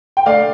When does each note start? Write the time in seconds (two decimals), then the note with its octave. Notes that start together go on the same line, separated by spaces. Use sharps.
0.17 G5
0.26 D3 A3 D5 F5